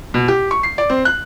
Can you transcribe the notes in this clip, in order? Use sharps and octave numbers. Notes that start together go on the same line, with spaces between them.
B2
G4
C#6
C7
D5
C4
F#6